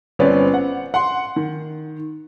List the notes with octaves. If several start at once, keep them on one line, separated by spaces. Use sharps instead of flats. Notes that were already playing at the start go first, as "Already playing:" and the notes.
G1 C4 C#4 B4 D5
F#5
F#5 C6
D#3